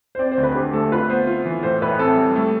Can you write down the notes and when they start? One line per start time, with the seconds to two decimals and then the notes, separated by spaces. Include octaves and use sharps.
0.15 C5
0.19 C4 D5
0.32 C5
0.38 D2
0.43 B4
0.55 D3 G4
0.73 A3 A4
0.92 F4 B4
1.10 B3 C5
1.27 F4
1.46 E3
1.63 A2 C5
1.82 A2 B4
1.99 C4 A4
2.17 G3
2.36 A3